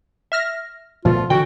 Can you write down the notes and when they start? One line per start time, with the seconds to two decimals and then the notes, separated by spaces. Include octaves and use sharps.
0.32 E5 F6 A#6
1.05 A#2 F3 A3 B3 F4
1.30 D3 E3 F#4 G5